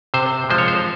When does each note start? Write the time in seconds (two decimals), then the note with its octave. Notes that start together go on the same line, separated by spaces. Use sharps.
0.14 C3 C5
0.50 F3 G#3 C5
0.58 C#5
0.68 C5